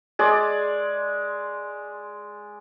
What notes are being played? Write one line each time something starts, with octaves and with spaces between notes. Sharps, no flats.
G#3 D5